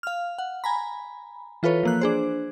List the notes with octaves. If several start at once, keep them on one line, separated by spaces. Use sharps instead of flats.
F5 F6
F#5
G#5 A#5 B5
E3 F4 A4 B4 C#5
F3 A#3 F#6
D4 G#4 C5